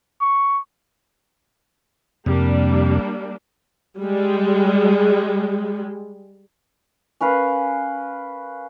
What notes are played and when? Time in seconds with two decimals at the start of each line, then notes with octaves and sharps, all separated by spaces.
0.20 C#6
2.26 F2 C3 G3 A#3 D4
3.98 G3 G#3
7.21 C#4 A#4 B4 F5